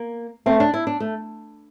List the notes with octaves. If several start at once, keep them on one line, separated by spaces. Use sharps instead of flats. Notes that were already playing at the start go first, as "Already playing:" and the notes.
Already playing: A#3
A3 C4
D4
E4
D4
A3